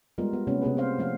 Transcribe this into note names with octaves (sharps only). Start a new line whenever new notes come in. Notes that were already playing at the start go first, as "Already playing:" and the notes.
G3 G#3 B3 F4 A#4
B3
C3 A#3 B3 C#4
C3 B3 G#4 B4
B3 G#4 C5 F5
F3 A3 F5